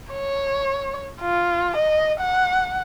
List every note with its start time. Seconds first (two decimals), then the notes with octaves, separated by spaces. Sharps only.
0.12 C#5
1.22 F4
1.77 D#5
2.21 F#5